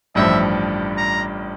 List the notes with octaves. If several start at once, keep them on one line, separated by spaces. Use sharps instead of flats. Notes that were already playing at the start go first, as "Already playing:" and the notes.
A1 G2 F3 E5
A#5